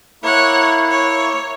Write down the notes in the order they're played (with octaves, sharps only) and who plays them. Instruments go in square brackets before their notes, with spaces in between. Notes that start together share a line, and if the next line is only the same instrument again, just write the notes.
[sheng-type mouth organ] A#3 E4 [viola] C#5 F#5
[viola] C#5